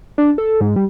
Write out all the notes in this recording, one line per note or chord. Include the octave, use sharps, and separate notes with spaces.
D4
A4
G#2
G3